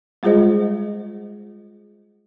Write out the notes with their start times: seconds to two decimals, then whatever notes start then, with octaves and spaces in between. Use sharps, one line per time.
0.23 G3 G#3 F4 G#4 C5 D#5